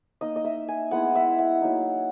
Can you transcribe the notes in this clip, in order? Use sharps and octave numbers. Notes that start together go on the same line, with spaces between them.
A#3 D#4 D#5
D#5
E5
G#5
G#3 B3 E4 F#5
E5
F#5
F#3 A#3 D#4